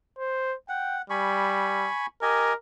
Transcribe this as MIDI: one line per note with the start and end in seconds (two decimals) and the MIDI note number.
0.19 0.55 72
0.69 1.02 78
0.69 0.98 79
1.10 1.89 55
1.10 2.06 80
1.10 2.06 83
1.10 2.06 85
2.22 2.53 67
2.22 2.55 70
2.22 2.53 75
2.22 2.53 80